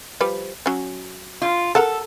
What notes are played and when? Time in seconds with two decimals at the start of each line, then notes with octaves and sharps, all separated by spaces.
0.21 F3 G3 B4
0.66 F#3 C#4
1.42 F4
1.75 A4 A#4 F#5 A5